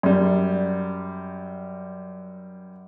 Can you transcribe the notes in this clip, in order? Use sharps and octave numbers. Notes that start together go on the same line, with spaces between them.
F#2 G3